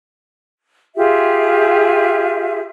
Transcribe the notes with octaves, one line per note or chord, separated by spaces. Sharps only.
F4 G4 G#4 E5